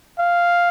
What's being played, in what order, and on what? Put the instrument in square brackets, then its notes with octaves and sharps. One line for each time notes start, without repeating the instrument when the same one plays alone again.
[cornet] F5